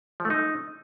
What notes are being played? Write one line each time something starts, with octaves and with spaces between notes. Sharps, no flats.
F3
A3
D#4